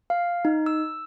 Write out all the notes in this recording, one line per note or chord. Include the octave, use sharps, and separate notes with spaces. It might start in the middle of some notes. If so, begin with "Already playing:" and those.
F5
D#4
E6